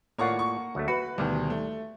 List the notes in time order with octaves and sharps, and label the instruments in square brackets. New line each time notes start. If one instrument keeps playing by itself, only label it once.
[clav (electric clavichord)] A2 F4 D5 [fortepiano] A#3 F#5 [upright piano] C#5 C#6
[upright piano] C#6
[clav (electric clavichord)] D2 F#3 A3
[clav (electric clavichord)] F#4 [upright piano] B4 B5
[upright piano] D2 B2 D#3 [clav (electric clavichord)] G3
[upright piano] A3